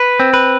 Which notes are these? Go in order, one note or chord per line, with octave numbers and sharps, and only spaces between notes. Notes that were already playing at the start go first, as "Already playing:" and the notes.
Already playing: B4
C4
B4